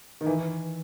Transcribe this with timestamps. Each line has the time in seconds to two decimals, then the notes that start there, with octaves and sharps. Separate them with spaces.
0.21 D#3
0.27 E3